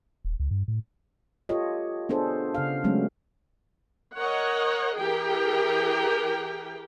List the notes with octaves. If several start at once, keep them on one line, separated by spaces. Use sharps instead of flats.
D#1
C#2
G2
A2
F4 G4 A4 C#5 D#5
B3 D4 G#4 A4 C5
C#3 F5
F#3 G#3 A3 B3 C#4
A#4 C#5 D#5 F#5
E3 G4 G#4 A#4 G5